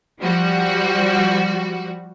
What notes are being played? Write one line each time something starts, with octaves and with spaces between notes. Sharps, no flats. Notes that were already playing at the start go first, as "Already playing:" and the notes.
F3 G3 F#4